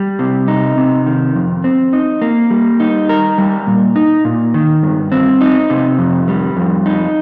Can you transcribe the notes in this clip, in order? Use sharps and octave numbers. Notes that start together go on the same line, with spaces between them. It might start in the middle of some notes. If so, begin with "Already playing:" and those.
Already playing: G3
C3
D#4
C3
D#3
F2
C4
D#4
A#3
G3
D#4
A#4
G3
A#2
D#4
A#2
D#3
G2
C4
D#4
C3
F2
G3
F2
D#4